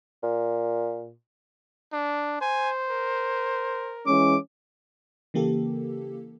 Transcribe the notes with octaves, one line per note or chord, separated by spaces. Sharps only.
A#2
D4
C5 G#5
A#4
E3 G#3 C#4 D6
C#3 E3 A#3 G4 A4